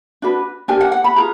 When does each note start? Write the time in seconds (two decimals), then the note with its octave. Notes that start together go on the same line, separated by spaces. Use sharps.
0.22 D4 F#4 B4
0.68 D4 G4 A#4 G#5
0.81 F#5
0.92 F#5
1.04 B5
1.16 F4 G#4 B4 A#5